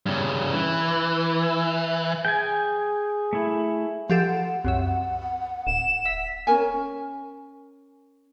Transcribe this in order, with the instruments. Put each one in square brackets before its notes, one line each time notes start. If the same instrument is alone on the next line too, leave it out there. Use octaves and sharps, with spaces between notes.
[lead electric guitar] G2 C#3
E3
[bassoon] G#4 [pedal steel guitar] G5 G#5
[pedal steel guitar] A3 E4
[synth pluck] F3 G4 A4 [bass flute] F#5
[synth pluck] C2 F#2 E5
[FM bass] D1 [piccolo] E7
[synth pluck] E5 [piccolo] B6
[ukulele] C#4 D#4 A#4 G#5